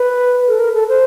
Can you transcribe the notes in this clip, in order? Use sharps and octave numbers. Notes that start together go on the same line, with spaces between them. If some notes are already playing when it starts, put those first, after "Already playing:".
Already playing: B4
A4
A#4
A4
C5